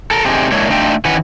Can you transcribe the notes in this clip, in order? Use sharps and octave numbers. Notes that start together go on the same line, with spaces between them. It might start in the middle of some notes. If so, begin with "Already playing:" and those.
A4 A#4
A3 C4 D4 D#4 G4 G#4
G#3 A#3 D4 E4 C#5
A3 D4 D#4 F4 E5 G5
D#3 E3 C#4 B4 F#5